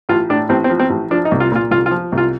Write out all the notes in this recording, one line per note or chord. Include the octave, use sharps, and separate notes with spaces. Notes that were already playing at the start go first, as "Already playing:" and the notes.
A1 F4
A2 D4
A1 C4
C4
F3
C4
A1
F3 D4
D#4
C2
F4
A#2 F4
C2 F4
F4
F3
C2
F4